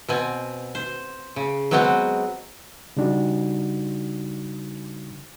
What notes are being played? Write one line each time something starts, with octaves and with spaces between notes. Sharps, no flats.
B2 C4 G#5
C5
C#3
F#3 G#3 B3 C4 F#4 D#5
C#3 G3 D4 D#4 F#4